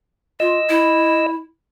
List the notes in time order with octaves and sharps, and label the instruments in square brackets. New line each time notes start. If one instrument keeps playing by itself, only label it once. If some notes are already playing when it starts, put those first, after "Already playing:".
[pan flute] F4 [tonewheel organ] D#5 E6
[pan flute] E4